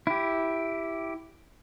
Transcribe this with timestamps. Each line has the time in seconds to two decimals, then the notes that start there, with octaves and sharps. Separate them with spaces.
0.07 E4 G4